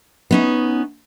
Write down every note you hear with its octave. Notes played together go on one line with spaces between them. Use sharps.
B3 C#4 D#4